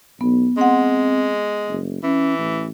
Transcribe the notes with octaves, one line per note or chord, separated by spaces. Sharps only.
B1 B3
G#3 C4 F#5 C6
F#1
E3 C#4
A1